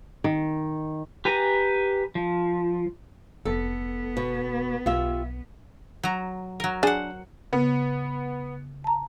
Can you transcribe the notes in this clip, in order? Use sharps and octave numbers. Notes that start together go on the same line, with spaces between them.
D#3
G4 B4 G#5 A#5
F3
F1 B3 A4
B2
B1 F4 G4 E5
F#3 A#5
F#3 A#4
D4 G#4 C5 F#5
C#3 B3
A5 A#5